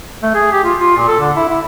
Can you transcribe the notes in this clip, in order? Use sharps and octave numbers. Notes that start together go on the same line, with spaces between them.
A3
G#4
G4
F4
F4
A#2
A4
D3
E4
E4